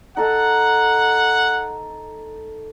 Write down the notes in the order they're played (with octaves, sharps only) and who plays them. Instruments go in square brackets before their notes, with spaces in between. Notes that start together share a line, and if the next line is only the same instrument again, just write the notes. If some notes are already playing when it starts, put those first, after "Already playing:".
[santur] D#4 A4 [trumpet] F#5